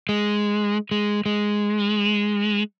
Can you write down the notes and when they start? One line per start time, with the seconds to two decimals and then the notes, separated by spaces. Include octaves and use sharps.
0.09 G#3
0.91 G#3
1.26 G#3